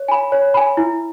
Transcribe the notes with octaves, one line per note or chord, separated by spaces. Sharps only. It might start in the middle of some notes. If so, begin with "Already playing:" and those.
Already playing: C#5
G#5 B5
C#5
G#5 B5
E4